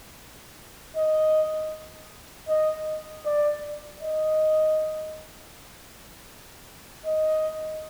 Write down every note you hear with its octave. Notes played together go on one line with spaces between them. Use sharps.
D#5
D#5
D5
D#5
D#5